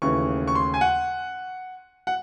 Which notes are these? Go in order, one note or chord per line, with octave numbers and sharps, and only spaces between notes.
D#2 C#3 E3 A3 C#6
C#6
C6
G#5
F#5
F#5